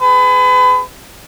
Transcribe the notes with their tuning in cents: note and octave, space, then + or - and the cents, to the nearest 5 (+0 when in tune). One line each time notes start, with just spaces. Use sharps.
G#4 +0 B4 +35